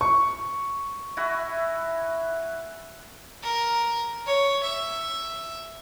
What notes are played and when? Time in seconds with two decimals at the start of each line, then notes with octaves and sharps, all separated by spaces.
0.01 C#6
1.17 E4 F#4 G#5
3.43 A#4
4.26 C#5
4.63 E5